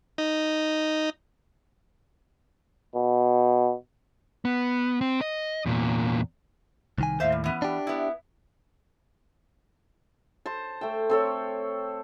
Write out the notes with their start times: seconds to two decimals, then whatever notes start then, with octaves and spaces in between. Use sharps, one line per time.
0.18 D#4
2.96 B2
4.45 B3
5.01 C4
5.21 D#5
5.66 E2 A#2
6.98 C2 D#3 G#5
7.20 D#2 A2 C5 E5 F5
7.32 G3
7.44 E3 B3 C#4
7.62 D4 G4
7.87 B3 E4
10.46 C5 A5
10.81 A3 G5
11.10 C4 A4 C#5